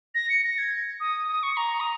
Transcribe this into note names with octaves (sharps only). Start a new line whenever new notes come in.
A#6
C#7
A#6
G#6
D#6
D#6
C#6
A#5
D#6